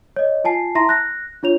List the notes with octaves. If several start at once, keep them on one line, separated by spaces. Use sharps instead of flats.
C#5 D#5
F4 G#5 A5 C7
E4 E5 A5 A#5 C6 A#6
F#6 A#6
D4 F4 C#5 F7